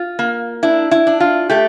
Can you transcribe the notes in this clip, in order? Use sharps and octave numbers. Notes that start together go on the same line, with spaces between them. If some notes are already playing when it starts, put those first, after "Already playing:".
Already playing: F4
A#3
D4 E4
E4
D4
F4
A3 G4